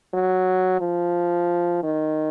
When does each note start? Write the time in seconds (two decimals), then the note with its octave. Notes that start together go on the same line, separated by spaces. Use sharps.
0.14 F#3
0.81 F3
1.83 D#3